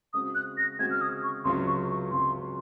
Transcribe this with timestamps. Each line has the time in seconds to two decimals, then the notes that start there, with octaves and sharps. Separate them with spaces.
0.13 C#3 G#3 C4 F#4 D#6
0.35 F#6
0.57 A#6
0.79 C#3 G#3 C4 F#4 G#6
0.91 F6
1.01 D#6
1.23 C#6
1.44 C#2 C3 F#3 C#4 F4 C6
1.67 C#6
1.88 C#6
2.11 C#2 C3 F#3 C#4 F4 C6